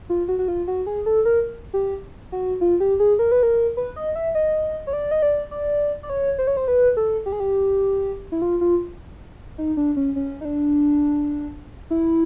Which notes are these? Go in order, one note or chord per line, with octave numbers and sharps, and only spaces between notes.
F4
F#4
F#4
F4
F#4
G#4
A4
A#4
G4
F#4
F4
G4
G#4
A#4
B4
A#4
B4
D#5
E5
D#5
C#5
D5
D#5
D5
D5
D5
C#5
C5
C#5
C5
B4
A4
G4
G#4
G4
E4
F4
F4
D#4
D4
C#4
C#4
D#4
D4
E4